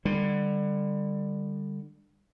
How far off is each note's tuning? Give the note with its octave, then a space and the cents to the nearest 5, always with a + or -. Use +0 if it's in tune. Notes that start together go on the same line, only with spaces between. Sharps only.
D3 +25 G3 +20